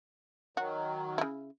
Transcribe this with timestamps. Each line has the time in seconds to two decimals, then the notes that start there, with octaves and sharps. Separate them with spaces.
0.57 D#3 F#3 F#4
1.18 C#3 E4